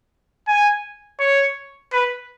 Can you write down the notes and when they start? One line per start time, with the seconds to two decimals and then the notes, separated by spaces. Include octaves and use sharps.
0.48 G#5
1.20 C#5
1.93 B4